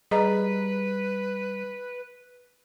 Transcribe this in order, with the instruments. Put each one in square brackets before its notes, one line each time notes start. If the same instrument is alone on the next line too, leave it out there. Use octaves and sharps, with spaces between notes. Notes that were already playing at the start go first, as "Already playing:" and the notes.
[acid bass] G3 [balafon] G#4 D#5 A#5 [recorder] B4